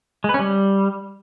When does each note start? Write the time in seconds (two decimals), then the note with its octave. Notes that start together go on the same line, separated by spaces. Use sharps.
0.24 G#3
0.29 B4
0.34 C#4
0.39 G3